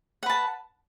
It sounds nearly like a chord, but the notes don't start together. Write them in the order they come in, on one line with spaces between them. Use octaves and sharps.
F#5 B4 A5